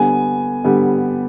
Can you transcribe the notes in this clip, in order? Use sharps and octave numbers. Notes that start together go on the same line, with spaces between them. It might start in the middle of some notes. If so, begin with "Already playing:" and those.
Already playing: D3 G3 B3 G#5
D3 G3 B3